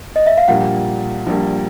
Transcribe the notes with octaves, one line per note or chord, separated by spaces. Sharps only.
D#5
E5
F5
A#1 A#2 G3 A#3 F#5
A#1 A#2 G3 A#3